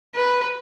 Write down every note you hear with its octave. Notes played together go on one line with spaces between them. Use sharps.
B4